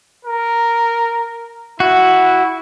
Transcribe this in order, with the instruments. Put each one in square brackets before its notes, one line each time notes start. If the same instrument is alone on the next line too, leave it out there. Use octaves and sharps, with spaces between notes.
[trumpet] A#4
[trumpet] E4 [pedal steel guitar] F#4